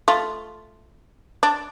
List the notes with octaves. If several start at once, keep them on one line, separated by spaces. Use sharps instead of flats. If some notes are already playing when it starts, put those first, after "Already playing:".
A3 F4
D4